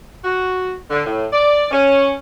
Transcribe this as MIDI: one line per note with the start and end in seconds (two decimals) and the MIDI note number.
0.24 0.73 66
0.90 1.02 50
1.05 1.26 45
1.32 1.67 74
1.71 2.13 61